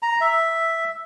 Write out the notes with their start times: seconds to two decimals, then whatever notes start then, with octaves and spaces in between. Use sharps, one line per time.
0.03 A#5
0.21 E5